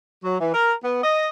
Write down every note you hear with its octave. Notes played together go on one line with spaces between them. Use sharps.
F#3
E3
A#4
B3
D#5